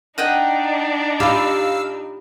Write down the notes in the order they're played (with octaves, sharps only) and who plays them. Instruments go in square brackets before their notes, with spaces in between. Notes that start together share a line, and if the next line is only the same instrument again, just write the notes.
[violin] D4 D#4 [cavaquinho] D#5 F#5 G5
[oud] F4 G4 [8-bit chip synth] F5 E6 [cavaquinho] B5